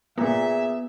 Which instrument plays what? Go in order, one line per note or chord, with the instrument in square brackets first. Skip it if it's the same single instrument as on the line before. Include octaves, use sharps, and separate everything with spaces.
[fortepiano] A#2 [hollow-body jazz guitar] B3 [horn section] G#4 E5